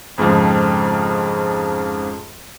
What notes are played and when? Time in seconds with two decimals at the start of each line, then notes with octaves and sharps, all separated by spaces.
0.18 F2 G#2 C#3 F3